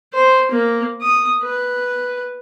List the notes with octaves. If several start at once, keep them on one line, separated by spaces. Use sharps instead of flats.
C5
A#3
D#6
B4